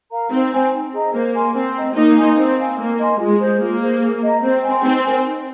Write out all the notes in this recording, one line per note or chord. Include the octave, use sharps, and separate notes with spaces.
A#4 F5 A#5
C4 D#4
C5 G#5
D#4
G#4 D#5 A#5
A#3 C5
G#5 C6
C4 A#4
D#5 A#5
A#3 D#4 A#4
G#5 C6
C4 C5
F5 G#5
A#3 A#4
D#5 G#5 C6
G#3 F4
G#4 C5
A#3 F4
G#4 C5
G#4
D#5 A#5
C4 C5
G#5 C6
C4 D#4
A#4 G#5
D#4